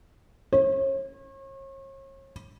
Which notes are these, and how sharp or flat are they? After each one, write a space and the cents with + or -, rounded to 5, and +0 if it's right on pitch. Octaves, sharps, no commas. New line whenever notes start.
C#5 -40